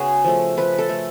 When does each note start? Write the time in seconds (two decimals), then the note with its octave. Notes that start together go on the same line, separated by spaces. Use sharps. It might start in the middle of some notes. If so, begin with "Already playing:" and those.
Already playing: C#3 B3 F#4 G#4
0.24 F3 A3
0.57 F3 B4
0.78 A4
0.89 A3